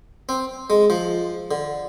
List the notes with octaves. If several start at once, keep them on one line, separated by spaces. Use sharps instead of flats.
C4
G#3
F3
D3